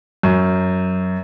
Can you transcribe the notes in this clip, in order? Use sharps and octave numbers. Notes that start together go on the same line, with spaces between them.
F#2